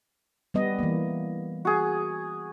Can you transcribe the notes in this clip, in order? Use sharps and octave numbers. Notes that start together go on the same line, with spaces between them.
G3 B3 D#5
E3 A#3
F#4 G#4